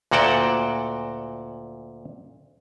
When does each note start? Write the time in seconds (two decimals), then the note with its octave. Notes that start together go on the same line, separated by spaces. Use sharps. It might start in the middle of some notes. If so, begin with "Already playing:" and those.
0.11 D2 A#2 F#4 F#5 G5 A5